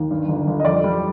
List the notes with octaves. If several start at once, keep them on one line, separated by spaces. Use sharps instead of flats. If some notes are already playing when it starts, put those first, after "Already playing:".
Already playing: D#2
G2
G1
G1
D#5
F2 D5
G3